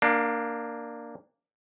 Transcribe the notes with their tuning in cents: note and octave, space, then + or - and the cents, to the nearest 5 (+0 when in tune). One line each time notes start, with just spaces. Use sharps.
A#3 +0 D4 +15 F#5 -45